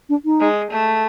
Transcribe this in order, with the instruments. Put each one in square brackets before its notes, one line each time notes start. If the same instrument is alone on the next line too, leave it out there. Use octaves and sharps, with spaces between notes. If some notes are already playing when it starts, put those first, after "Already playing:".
[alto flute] D4
D#4
[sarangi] G#3
A3